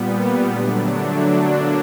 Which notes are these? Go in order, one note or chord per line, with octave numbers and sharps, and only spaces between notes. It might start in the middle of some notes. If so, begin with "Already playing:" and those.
Already playing: A#2 G3 B3
D3 F#3 A3 D4
D3 F#3 A#3 D4